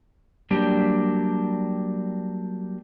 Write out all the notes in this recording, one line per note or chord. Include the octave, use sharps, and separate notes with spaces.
F#3 G3 A#3 D4 G4